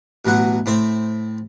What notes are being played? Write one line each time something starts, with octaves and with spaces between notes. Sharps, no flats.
A1 B2 F#3 F#5
A2 C4 C5 E5